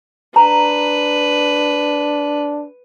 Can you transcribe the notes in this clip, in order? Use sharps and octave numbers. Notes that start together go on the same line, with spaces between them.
D4 B4 A#5